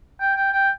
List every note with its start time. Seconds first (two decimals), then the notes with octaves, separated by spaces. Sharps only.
0.20 G5
0.35 G5
0.52 G5